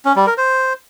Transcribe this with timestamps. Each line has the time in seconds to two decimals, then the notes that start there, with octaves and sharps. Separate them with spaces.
0.05 C#4
0.16 G3
0.27 A#4
0.38 C5